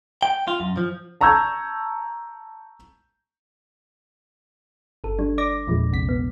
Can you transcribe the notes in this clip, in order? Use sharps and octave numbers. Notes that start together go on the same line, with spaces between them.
G5
F4
F#2
F3
A5 A#5 C#6 E6 G6 G#6
G1 A4
G3 D4
D5 D6 A#6
E2 A#2 F3 G#3
A#1 C3 B6
B3